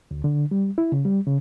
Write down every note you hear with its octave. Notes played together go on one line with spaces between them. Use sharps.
D2
D3
G3
E4
C#3
G3
C#3